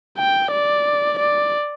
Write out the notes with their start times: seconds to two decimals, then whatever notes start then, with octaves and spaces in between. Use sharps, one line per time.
0.18 G5
0.52 D5
1.19 D5